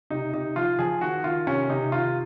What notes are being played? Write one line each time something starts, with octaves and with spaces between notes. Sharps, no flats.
C3 D#4
C3 D#4
F3 F4
F3 G#4
D#3 F#4
D#3 F4
C3 C#4
C3 D#4
D#3 F4